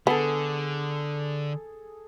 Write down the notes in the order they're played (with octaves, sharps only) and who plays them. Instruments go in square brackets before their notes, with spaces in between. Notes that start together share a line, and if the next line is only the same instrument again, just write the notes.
[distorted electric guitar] D3 [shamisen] B3 [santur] G#4 A4